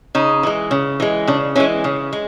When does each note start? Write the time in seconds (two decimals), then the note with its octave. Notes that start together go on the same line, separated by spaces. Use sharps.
0.15 C#3 D#4
0.43 E3 G#3
0.71 C#3
1.00 E3 G#3
1.28 C#3 D4
1.55 E3 G#3 C#4
1.84 C#3
2.13 G#3